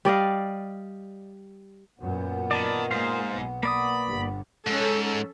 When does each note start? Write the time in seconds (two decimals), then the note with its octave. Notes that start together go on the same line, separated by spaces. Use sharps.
0.05 G3 D5 D#5 F5
1.99 F#2 A#2 B3
2.51 D#3 D5 A5 B5
2.91 G#2 G#3 A#3 C5 F5
3.29 B1 B3
3.63 A#3 B3 D5 B5 D#6
4.07 G1 G2
4.67 G#2 C#4 A4